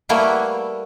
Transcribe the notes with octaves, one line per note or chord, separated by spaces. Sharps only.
G3 A3 A#3 E4 F#4 B4